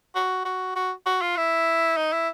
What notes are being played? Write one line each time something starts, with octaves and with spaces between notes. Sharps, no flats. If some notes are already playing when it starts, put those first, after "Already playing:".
F#4
F#4
F#4
F#4
F4
E4
D#4
E4